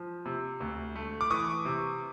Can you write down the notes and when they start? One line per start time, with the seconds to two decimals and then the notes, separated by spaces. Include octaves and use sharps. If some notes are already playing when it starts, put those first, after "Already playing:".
Already playing: F3
0.25 C3
0.60 D2
0.96 A3
1.21 D6
1.31 E3 C#6 D#6
1.65 C3